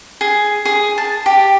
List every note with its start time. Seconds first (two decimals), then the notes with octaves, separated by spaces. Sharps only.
0.21 G#4
0.65 G#4
0.98 A5
1.26 G4